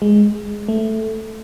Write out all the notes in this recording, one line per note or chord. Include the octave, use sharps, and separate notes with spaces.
G#3
A3